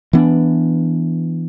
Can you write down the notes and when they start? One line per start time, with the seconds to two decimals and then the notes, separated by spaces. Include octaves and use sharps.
0.13 E3 B3 D4